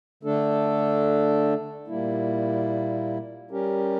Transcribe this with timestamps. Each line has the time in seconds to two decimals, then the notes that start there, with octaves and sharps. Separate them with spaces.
0.23 D3 A3 D4 A4
1.88 A#2 G3 A#3 E4
3.51 G3 C#4 G4 A#4